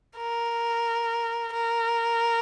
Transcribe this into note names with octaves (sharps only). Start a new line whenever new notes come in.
A#4
A#4